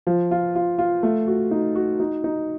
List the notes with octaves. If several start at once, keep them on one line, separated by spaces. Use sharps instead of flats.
F3
F4
F4
F4
A3
F#4
D#4
F#4
D#4
D#4